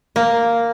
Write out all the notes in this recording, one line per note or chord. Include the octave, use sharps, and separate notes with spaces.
A#3